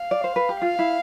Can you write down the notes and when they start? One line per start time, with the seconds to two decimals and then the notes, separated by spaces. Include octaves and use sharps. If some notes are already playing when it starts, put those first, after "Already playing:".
Already playing: F5
0.11 D5
0.24 C5
0.36 B4
0.49 G4
0.61 F4 F5
0.79 E4